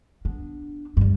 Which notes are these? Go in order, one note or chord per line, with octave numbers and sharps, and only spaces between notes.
B3 D4
G2 G3